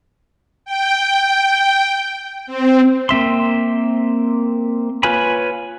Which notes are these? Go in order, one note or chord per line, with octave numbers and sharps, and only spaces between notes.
G5
C4
A#3 C4 E5 C6
F4 B4 C#5 G#5 B5